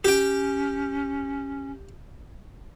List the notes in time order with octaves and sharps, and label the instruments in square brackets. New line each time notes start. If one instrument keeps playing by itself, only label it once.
[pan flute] C#4 [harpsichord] G4 G5